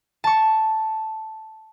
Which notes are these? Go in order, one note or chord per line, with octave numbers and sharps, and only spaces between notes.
A5 C#6